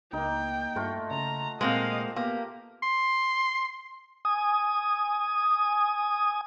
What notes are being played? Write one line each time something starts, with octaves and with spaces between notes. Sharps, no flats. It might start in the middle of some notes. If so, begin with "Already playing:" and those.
C#2 A#3 D#4 G5
G2 A3 F4 F#4
C#3 A#5
A#2 G#3 A#3 C4 D#5 F5
A#3 B3 G4
C6
G#5 D#6